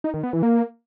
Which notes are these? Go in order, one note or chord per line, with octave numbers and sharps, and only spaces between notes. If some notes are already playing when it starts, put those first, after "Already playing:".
D#4
D#3
B3
E3
A#3